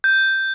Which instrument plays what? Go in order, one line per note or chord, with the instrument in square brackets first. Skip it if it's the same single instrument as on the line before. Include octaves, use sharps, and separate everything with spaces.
[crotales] G6